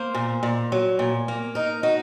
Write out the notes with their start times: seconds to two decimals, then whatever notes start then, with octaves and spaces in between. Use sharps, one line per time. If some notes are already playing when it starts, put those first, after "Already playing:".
Already playing: A#3 C5
0.15 A#2
0.43 A#2
0.72 F#3
0.99 A#2
1.28 A#3
1.55 D#4 A#4
1.83 D#4 F#4